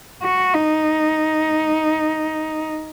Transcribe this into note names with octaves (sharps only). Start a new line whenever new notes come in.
F#4
D#4